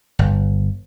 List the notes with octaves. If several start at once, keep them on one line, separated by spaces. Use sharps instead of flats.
G1